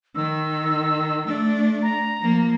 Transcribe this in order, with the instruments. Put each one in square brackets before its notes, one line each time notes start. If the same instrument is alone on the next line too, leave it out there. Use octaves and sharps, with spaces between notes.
[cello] D#3 [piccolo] E6
[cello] A3 D4
[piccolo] A#5
[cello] F3 A#3